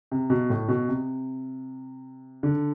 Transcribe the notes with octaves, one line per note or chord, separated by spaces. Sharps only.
C3
B2
A2
B2
C3
D3